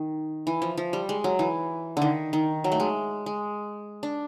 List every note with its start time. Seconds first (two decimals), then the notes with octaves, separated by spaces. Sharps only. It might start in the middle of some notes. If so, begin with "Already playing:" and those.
Already playing: D#3
0.47 E3
0.62 F3
0.77 F3
0.93 G3
1.09 G#3
1.24 F#3
1.39 E3
1.97 D3 D#3
2.33 D#3
2.64 F#3
2.72 A3
2.80 G#3
3.26 G#3
4.03 D4